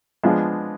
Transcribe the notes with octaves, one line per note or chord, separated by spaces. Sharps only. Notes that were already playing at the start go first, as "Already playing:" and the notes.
F3 G#3 B3 D4